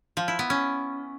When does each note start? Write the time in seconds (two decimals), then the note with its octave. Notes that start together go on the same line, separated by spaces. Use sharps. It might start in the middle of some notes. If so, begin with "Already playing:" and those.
0.17 F3
0.28 E4
0.39 B3
0.50 C#4